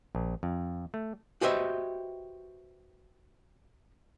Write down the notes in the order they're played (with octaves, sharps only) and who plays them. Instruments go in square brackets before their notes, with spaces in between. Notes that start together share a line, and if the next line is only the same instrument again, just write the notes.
[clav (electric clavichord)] A#1
F2
A3
[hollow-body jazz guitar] F#4 G4 B4 C5 D#5 E5